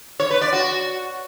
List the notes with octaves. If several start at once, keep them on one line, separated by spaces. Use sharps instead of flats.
C#5
B4
D5
F#4